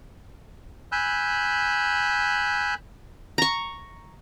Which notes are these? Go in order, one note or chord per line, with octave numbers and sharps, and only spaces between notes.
G#5 B5 E6 F#6 G6
A#5 C#6